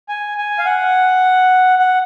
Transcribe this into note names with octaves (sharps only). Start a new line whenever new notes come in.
G#5
G#5
F5
F#5
F#5